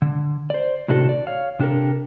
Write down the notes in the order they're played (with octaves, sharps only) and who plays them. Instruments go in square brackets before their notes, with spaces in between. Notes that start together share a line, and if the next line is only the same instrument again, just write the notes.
[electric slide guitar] D3
C5 D5
A2 C3 D#3 D4 F#4 A4
D5
C#5 F5
C3 D4 G4 A4 A#4